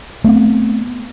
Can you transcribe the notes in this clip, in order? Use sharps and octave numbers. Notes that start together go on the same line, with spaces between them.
A3 B3 C4